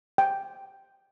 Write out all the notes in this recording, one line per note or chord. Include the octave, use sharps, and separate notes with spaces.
G5